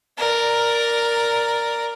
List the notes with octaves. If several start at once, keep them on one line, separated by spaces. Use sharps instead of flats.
A#4 D5